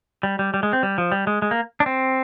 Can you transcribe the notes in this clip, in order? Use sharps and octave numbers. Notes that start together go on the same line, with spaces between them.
G3
G3
G3
G#3
C4
G3
F3
G3
G#3
G#3
A#3
D4
C4